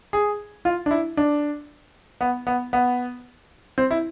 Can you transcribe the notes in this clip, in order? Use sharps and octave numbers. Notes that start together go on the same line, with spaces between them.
G#4
F4
D4
E4
D4
B3
B3
B3
C4
E4